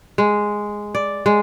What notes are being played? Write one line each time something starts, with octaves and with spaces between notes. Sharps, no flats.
G#3
D5
G#3